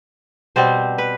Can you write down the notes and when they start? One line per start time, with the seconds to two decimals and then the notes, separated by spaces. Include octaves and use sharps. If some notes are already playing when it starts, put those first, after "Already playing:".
0.56 B2 G3 C4 C5
0.98 B4